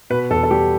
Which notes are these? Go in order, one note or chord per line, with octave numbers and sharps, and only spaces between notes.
B2 B4
E2 A4
A4
G3 G4